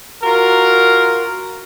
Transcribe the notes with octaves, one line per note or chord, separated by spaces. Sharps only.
F4 F#4 A#4